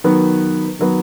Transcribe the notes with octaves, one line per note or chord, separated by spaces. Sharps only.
D#3 F#3 B3
D#3 F#3 B3